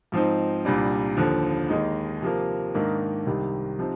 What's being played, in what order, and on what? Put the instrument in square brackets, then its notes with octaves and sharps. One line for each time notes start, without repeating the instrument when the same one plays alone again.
[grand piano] G#2 F3 C4 D#4
C2 A#2 G3 D4
D#2 D3 F3
D#2 D#3 G#3 D#4
C3 F3 A#3
G#2 D#3 A#3 D4
C2 C3 D#3
C3 F3 C4 D#4